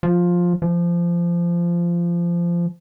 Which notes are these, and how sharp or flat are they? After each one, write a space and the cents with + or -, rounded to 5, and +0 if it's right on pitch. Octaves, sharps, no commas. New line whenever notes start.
F3 +10
F3 -20